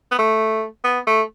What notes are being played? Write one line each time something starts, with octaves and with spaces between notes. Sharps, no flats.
B3
A3
B3
A3